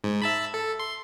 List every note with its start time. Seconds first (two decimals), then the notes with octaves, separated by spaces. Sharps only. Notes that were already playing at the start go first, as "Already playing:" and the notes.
0.04 G#2
0.22 E5 A5 B5
0.54 A4
0.80 C6